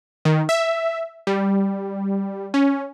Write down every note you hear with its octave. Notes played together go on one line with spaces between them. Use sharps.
D#3
E5
G3
C#4